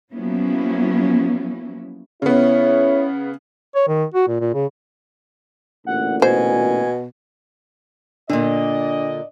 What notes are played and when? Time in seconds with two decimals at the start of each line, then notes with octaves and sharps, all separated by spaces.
0.12 F3 F#3 A#3 B3 C#4 E4
2.22 C#3 B3 E4 C#5
3.75 C#5
3.87 D#3
4.14 F#4
4.27 A#2
4.40 A#2
4.54 C#3
5.86 A1 D2 A#2 F#5
6.22 B2 C5 G#5
8.30 A#2 D3 D4 D5 D#5